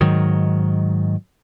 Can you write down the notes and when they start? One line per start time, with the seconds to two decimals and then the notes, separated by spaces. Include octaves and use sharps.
0.01 G#2 D#3 F#3